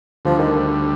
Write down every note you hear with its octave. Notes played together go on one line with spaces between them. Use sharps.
D2 D3 F3 G3
D#3